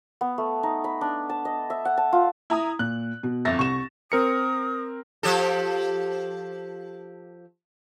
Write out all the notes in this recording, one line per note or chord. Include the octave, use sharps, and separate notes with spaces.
B3
A3
D#4
B5
D4
A5
D#5
E5
F#5
A5
F4
E4 A#5 D#6
A#2 F#6
B2
G1 F2 E5 A6 A#6
C2 C#6 E7
C4 A#4 D#6 C#7
F3 G4 A4